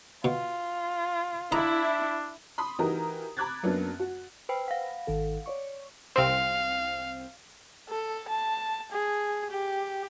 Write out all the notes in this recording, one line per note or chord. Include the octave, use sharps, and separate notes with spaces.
B2 F4
D4 E4 D#5 A#5
B5 C6 D#6
E3 D#4 F#4 G4 A#4 A#5
A#5 B5 D6 F#6 G#6 A6
F#2 F#3 A#3 B3 D4
F#4
B4 C5 G5 B5
F5 F#5
G#1 D#3 A4
C#5 D5 C#6
C2 C4 F5
A4
A5
G#4
G4